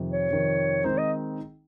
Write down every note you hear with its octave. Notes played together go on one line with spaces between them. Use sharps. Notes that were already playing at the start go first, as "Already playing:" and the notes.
Already playing: F2 C3 D#3
C#5
F2 C3 D#3
D#3 G#3 C4 D#4 C5
D#5